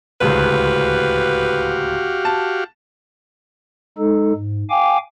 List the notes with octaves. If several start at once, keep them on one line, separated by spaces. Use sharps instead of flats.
D1 C#2 F#4 G4 B4 F5
A5
G#3 D#4 A4
G#2
F5 G5 G#5 D6